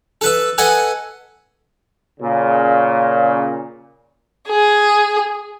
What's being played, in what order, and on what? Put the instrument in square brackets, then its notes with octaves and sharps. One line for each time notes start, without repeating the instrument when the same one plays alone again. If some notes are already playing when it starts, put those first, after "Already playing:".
[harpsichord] A4 B4 E5
A4 B4 D#5 F#5 G#5
[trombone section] A#2 C#3
[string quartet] G#4